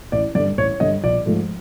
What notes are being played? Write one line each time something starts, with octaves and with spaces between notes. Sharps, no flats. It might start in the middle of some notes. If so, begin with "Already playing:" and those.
A1 D5
G2 D3 D5
A1 C#5
G2 D3 D#5
A#1 D5
G#2 F3 A3